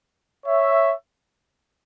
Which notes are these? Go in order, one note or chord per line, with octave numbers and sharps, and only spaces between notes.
C#5 E5